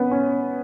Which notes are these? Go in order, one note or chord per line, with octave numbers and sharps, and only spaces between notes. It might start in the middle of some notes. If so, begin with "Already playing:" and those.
Already playing: B3 C#4
C#4